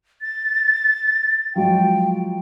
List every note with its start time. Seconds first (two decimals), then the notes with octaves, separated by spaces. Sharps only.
0.22 A6
1.55 F3 F#3 G#3 G5